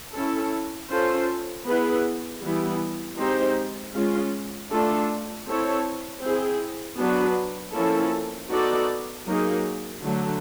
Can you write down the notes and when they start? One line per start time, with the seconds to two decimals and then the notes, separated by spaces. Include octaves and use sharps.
0.15 C#4 E4 A4
0.91 C#4 F4 A4 C5
1.67 B3 E4 G#4 B4
2.43 E3 G3 B3 E4
3.18 G#3 C4 D#4 G4 C5
3.94 G#3 C#4 F4
4.71 A3 D4 F4 A4
5.47 C4 E4 A4 C#5
6.23 C4 E4 G#4
6.99 F#3 B3 D4 F#4 B4
7.74 F3 A#3 C#4 E4 A4
8.51 B3 D#4 F#4 A4 D5
9.27 F#3 A#3 D#4 G#4
10.03 D3 F#3 A3